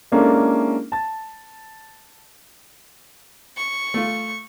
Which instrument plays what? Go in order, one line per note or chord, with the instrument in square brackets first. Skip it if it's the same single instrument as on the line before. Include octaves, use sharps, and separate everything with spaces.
[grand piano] G#3 A#3 C#4 D4 E4 A4
A5 A6
[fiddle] C#6
[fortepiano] A3 F4